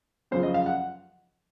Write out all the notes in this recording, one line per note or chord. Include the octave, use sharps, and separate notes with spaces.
F#2 C#3 F3 C5
D#5
F5
F#5